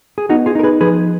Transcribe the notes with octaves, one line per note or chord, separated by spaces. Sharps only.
G#4
B3 D#4 F#4
F4 G#4
D#4 A#4
G#4 B4
F3 G#4 B4